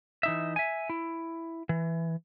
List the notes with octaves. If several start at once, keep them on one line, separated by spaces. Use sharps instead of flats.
E3 D#4 E5
E5 G#5
E4
E3